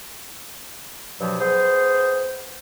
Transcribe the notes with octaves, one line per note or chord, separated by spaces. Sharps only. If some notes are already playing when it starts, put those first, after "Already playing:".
G2 B2 F3 F#3
B3 G#4 C5